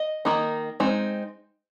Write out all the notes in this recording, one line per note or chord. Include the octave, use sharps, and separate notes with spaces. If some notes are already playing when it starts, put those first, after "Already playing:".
Already playing: D#5
D#3 A#3 D#4
G#3 C4 D#4